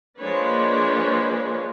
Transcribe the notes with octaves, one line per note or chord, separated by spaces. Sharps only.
F3 G#3 A#3 D4 B4 C#5